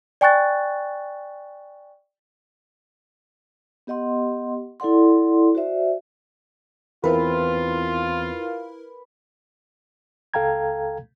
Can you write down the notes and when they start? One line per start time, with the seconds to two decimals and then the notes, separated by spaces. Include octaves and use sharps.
0.21 D5 G5 G#5 C#6 F#6 A6
3.87 B3 G4 D#5 F#5 C6
4.80 E4 A4 D5 F#5 C6
5.55 F#4 C5 D5 E5
7.04 E2 C4 E4 F4 A#4 B4
10.34 C#2 A4 F5 G5 A#5 G#6